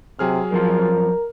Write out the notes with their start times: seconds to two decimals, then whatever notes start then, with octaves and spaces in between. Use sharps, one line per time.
0.19 C3 F#3 G#4 F6
0.52 F#2 F3 A#4 A5